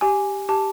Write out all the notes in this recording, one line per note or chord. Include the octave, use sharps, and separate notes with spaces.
G4 G#5
G4 A5